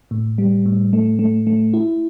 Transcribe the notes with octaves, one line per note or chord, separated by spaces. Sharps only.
A2
G3
A2
A3
A3
A3
E4